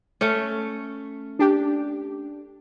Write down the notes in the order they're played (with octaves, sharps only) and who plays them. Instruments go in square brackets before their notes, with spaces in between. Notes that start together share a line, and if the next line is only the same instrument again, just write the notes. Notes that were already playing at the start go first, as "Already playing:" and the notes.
[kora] A3 C#4
[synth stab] D4 G4